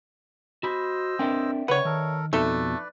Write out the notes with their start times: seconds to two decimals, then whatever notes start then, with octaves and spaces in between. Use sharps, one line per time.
0.63 F#4 C5 D#5 B5 E6
1.19 C4 D4 A#4 D5 E5 G5
1.68 C#3 B4 C#5 F#5
1.85 D#3 A4 A#4
2.33 F2 B2 A3 D#4 A4 B4 D5